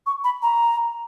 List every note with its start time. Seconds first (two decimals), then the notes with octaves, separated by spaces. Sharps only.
0.06 C#6
0.24 B5
0.42 A#5